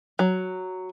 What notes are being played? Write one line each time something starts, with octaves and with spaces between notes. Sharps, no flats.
F#3